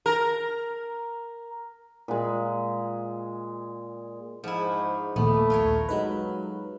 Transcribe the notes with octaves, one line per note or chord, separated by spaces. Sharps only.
A#4
A#2 G#3
G#2 F3 E4
A#1 D#2 A3 B3
F4 A#4 C#5
F#3 G#3 D#4 B4